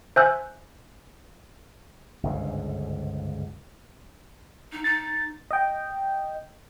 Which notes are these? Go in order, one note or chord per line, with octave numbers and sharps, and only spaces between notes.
C5 E5 G#5 E6 F#6 G6
G1 C#2 G#2
D#4
D#4 A6
D#5 G5